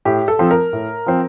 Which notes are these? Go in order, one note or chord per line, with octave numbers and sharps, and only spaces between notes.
A2 G4
A4
F3 C4
A#4
A2
F3 C4